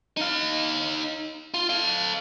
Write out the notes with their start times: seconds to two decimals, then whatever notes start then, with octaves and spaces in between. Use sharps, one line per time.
0.17 D#4 F5
1.54 F4
1.69 A4 F5